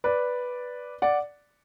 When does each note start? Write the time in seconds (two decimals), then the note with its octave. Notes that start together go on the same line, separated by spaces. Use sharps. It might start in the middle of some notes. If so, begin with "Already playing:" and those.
0.04 B4 D5
1.02 D5 F#5